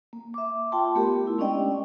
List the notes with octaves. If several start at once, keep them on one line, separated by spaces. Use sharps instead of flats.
A#3
E5 D6
F4 G5 A5 C6
A3 B3 G4 A#4
E4
G#3 C#4 D4 D5 D#5 G5